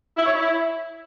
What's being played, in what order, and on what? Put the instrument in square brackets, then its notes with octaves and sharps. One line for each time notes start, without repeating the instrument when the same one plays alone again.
[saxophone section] E4
C#5
E4